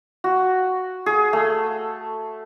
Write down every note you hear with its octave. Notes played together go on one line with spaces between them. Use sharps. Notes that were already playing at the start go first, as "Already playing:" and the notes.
F#4
G#4
A3